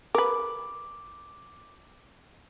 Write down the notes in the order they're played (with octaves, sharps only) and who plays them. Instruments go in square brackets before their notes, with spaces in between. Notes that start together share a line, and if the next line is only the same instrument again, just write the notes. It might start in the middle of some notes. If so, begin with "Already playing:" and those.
[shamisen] A#4 B4 [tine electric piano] D6